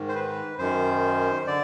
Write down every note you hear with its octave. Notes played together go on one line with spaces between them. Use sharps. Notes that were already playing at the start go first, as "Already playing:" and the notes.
Already playing: G#2 D#3
C5
B4
F#2 D#3 C5
D3 D5